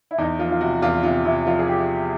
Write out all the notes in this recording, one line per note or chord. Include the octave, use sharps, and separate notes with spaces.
E4
E2 D#4
F3 F4
F4
C3 F#4
E2 F4
C3 F4
C3 E4
F3 F4
G#4
G4